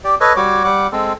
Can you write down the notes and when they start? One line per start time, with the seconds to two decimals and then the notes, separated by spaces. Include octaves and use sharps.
0.04 G4 D5
0.21 A4 B4 C#5 D#5
0.36 G3 F#4 C#5 D6
0.64 G3 F#5 D6
0.92 G#3 C4 A4